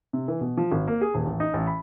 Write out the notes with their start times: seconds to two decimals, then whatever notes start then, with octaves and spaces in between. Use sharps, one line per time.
0.13 C3
0.28 E3
0.41 B2
0.57 F3
0.72 G#1
0.88 A#3
1.01 G#4
1.14 D#1
1.26 A1
1.40 D#4
1.54 A1
1.67 B5